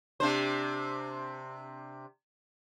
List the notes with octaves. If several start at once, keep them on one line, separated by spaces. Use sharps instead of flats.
C3 D4 C5